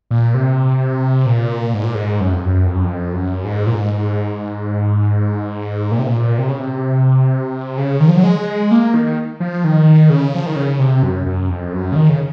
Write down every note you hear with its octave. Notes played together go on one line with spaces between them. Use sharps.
A#2
C3
A#2
G#2
A#2
G#2
F#2
F2
F#2
F2
F#2
F2
F#2
G#2
A#2
G#2
A#2
C3
A#2
C3
C#3
C3
C#3
D#3
F3
F#3
G#3
A#3
D#3
F3
D#3
C#3
F3
D#3
C#3
C3
F#2
F#2
F2
F#2
C#3
D#3
C#3